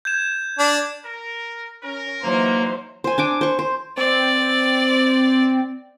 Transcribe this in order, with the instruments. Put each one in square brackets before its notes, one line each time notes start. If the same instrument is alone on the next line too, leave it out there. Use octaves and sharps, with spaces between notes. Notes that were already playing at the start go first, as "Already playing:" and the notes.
[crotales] G6 G#6 E7
[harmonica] D4
[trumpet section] A#4
[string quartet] C#4 [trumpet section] A#4
[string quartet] E3 F#3 D#4 [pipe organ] A#3 A#5 [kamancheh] C5
[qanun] C5 G#5
D4 G#5 D6
C5 C#6
C5
[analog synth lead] C4 [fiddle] D5